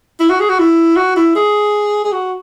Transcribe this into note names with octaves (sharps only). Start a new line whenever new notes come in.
E4
F#4
G#4
F#4
E4
F#4
E4
G#4
G#4
F#4